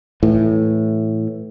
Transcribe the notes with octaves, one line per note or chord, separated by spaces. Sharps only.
A2 E3